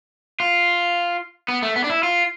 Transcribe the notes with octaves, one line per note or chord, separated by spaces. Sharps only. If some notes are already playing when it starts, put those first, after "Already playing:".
F4
B3
A3
B3
D4
E4
F4